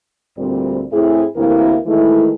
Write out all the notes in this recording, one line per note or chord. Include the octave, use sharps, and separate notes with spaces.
D2 A#2 G3 C4
A2 C4 E4 G#4
D2 C3 E3 A#3 E4 A#4
D#3 E3 G#3 A3 E4